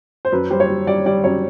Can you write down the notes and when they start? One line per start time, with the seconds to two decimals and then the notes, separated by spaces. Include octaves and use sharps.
0.25 C5
0.32 F#2 B4
0.50 G3 C5
0.60 C#5
0.69 G3
0.87 G3 D5
1.06 G3 D5
1.24 F#2 C#5